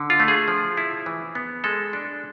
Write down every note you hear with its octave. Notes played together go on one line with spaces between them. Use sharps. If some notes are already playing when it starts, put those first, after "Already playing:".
Already playing: D3
F4
A3
G#4
F3
E4
E3
B3
G#3 A4
D4